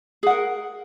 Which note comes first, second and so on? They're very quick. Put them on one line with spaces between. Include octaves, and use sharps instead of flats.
G#4 F#5 A#4